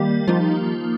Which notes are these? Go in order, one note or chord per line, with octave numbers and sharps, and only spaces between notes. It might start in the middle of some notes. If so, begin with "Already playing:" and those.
Already playing: D#3 G3 A#3 G4
F3 A#3 D#4 F4